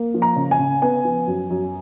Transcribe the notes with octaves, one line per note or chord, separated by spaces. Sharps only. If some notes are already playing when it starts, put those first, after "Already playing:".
Already playing: A#3
F3
A#5
C#3
G#5
C#3
B3 G#5
F3
F#2
F#2